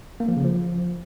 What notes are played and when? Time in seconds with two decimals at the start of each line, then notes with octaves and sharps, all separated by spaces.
0.20 A#3
0.28 F3
0.36 C#3
0.45 F3